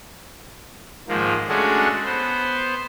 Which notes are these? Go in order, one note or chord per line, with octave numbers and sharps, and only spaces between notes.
G#2 D#3 F3 A#3
G#3 A3 C#4 D4 F#4 A4
B3 C5